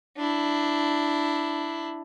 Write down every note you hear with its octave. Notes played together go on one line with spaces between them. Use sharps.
D4 E4